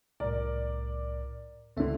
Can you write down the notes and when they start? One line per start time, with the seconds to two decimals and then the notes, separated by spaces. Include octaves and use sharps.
0.20 C2 A2 A#4 D5
1.77 C#2 D3 A3 C4 E5